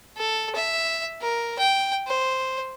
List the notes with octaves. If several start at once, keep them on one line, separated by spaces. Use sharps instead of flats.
A4
E5
A#4
G5
C5